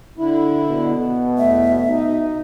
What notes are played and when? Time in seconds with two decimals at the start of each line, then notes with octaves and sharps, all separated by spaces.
0.18 D3 E4
0.69 B2
1.38 E2 A3 E5
1.88 D#4